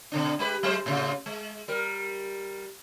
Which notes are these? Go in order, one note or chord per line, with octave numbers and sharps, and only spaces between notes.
B2 D3 D4
G#3 G4 B4
F#3 G#3 C5
A2 C#3
G#3
G3 A#4